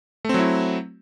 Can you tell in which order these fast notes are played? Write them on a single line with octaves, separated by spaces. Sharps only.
A3 C4 F#3 E4